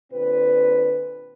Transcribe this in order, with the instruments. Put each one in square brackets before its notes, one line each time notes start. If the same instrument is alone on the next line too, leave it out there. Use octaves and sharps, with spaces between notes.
[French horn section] A#2 D3 C4 B4